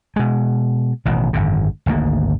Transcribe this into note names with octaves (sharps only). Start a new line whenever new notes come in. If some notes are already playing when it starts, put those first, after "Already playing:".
B2 G#3
A1 B2 D#3
G#1 F#2 D3
G#1 D2 G#2 A#3